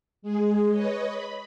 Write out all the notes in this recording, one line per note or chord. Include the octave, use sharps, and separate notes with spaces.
G#3 G#4
B4 C#5 D#5
B5